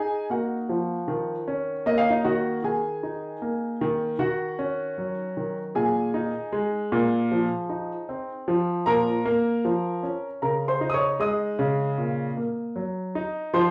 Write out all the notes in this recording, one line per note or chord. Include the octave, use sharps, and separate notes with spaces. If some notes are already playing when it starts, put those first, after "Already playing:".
Already playing: D#4 G#4 G#5
A#3 F#4 F#5
F3
D#3
C#4
A#3 D#5
F5
D#4 D#5
D#3 F#4 F#5
D#3 G#4 G#5
D#4
A#3
D#3
D#3 F#4 F#5
C#4
F#3
D#3
A#2 G#4 G#5
D#4
G#3
A#2
F3
D#4
C4
F3
A#2 A#4 A#5
A#3
F3
C#4
C#3 A#4 A#5
C5 C6
D#4
D#6
C#5 C#6
G#3 D#5 D#6
C#3
A#2
A#3
F#3
D#4
F3 C5 C6